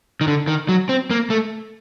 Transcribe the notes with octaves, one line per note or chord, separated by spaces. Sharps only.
D#3
D3
D#3
F#3
C4
A#3
A3